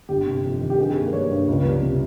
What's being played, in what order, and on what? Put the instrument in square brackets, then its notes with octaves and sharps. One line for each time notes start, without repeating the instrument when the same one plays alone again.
[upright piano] G1 G4
C3
F2
D#3
G4
G2 G#4
A#3
G3 C#5
G2
C#2
G3
C3